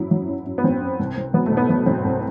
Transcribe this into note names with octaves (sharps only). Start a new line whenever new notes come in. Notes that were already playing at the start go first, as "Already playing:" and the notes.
Already playing: F#2 F#3 E4
F#3
F#2
F#2
B3
F#3 C4
F#2
C2
C2
F#3 B3
A3
B2
B3
F#3 B3
F#3 C4
C2